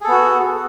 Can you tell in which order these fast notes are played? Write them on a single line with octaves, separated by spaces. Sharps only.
G#4 A4 B3 F#4